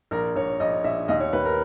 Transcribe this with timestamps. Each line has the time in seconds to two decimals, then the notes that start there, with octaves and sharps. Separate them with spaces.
0.11 A#1 A#4
0.36 A#1 C#5
0.60 A#1 D#5
0.84 A#1 E5
1.08 D#2 D#5
1.20 C#5
1.33 D#2 B4
1.45 A#4